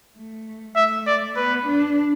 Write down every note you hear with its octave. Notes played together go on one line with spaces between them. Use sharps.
A3
A3 E5
D5
B3 B4
D4